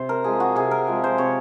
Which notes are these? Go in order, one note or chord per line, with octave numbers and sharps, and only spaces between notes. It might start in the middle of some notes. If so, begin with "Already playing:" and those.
Already playing: C3 C5
A#4
F3 G#3 G#4
F#4
C3 G#4
A#4
F3 G#3
C5
C3 C#5